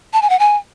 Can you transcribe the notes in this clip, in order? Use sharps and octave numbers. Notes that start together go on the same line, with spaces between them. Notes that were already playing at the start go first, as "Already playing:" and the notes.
A5
G#5
F#5
G#5